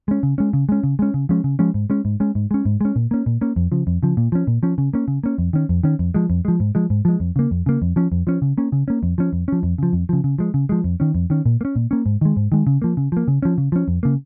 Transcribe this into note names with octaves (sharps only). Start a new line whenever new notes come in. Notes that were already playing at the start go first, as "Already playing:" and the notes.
G#3 C#4
C#3
G#3 C#4
C#3
G#3 C#4
C#3
G#3 C#4
C#3
F3 G#3 C#4
C#3
F3 G#3 C#4
G#2
G#3 C#4
G#2
G#3 C#4
G#2
G#3 C#4
G#2
G#3 C#4
A#2
A#3 C#4
A#2
A#3 C#4
F2
C#3 F3
F2
C#3 F3
A#2
F3 C#4
A#2
F3 C#4
C#3
A#3 C#4
C#3
A#3 C#4
F2
D#3 C#4
F2
D#3 C#4
F2
F3 G#3
F2
F3 G#3
G#2
F3 G#3
G#2
F3 G#3
F2
C#3 A#3
F2
C#3 A#3
F2
F3 C#4
F2
F3 C#4
C#3
A#3 C#4
C#3
A#3 C#4
F2
F3 C#4
F2
F3 C#4
F2
C#3 F3
F2
C#3 F3
C#3
F3 G#3
C#3
F3 G#3
F2
D#3 C#4
F2
D#3 C#4
A#2
A#3
C#4
A#2
A#3 C#4
G#2
D#3 G#3
G#2
D#3 G#3
C#3
F3 A#3
C#3
F3 A#3
C#3
F3 C#4
C#3
F3 C#4
F2
C#3 A#3